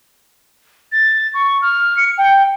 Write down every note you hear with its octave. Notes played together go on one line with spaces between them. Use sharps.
A6
C#6
F6
C#7
G5